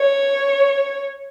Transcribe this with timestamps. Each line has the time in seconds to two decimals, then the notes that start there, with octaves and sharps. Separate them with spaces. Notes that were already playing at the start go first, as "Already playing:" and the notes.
Already playing: C#5